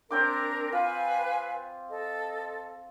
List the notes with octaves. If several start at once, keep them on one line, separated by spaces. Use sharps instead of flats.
C4 D4 A#4 G5 D6
F4 B4 F5 G#5
A4 D#5